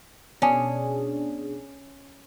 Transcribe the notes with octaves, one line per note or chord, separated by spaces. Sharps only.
B2 C#4 D4 G#4